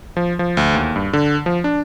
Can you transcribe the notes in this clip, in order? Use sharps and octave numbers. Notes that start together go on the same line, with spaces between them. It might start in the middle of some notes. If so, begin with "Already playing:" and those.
F3
F3
D2
D#2
G2
D3
F3
D4